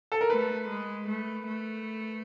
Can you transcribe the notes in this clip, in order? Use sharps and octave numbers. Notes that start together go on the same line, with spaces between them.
A4
A#4
A3 B4
G#3
A3
A3